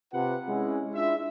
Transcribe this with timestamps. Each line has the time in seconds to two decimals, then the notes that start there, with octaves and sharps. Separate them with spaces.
0.13 C3 F4 B4 F#5
0.48 G#3 C#4 E4
0.94 D4 E4 F4 E5